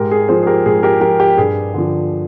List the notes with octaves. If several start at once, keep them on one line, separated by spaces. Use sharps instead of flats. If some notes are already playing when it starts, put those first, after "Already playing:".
Already playing: G#2 G4 A#4
G#4
F3 G#4 C5
G#4
G4 A#4
G#2 G#4
G4 A#4
F3 G4 A#4
G4
G2 G#4
D3 F3